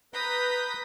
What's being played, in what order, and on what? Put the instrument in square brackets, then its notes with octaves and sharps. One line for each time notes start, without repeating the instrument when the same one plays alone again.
[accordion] B4 A#5 G6 [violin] D#6 B6